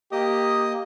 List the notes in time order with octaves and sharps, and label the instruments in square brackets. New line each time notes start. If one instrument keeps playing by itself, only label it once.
[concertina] A#3 D#5 D#6 [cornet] G4